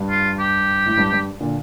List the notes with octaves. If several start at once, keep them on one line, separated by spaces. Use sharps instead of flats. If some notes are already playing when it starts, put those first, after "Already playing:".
Already playing: G2
F4
G4
A2
G2
G2
A#2 D3